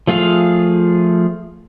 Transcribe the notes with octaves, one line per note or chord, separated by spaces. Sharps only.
F3 A3 F4 G#4 F5